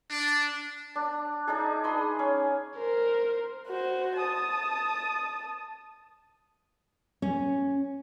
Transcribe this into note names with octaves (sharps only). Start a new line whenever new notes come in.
D4
D4
D4 D#4 G#4
B5 C6 D#6
C#4
A#4 C5
F#4 C5
A5 D#6
C#4